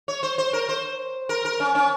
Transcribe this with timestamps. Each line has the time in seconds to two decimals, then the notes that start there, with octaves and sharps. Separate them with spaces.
0.08 C#5
0.23 C5
0.38 C5
0.53 A#4
0.69 C5
1.29 A#4
1.45 A#4
1.60 C#4
1.75 C#4